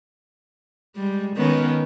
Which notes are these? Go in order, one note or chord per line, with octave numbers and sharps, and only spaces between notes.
G3 G#3
D#3 B3 C#4